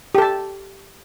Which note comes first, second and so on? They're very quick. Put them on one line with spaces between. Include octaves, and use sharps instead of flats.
G4 A4 A5